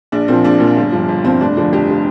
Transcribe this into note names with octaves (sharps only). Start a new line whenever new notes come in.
A#1 D4
A#2 F3 C4
A#1 D4
A#2 F3
G1
G2 F3
G1
G2 F3 C4
F1 D4
F2 D3 F3 D4
F1 G4
D3 F3